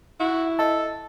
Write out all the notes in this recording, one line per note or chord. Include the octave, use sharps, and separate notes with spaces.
E4 F#4
A4 D#5 A5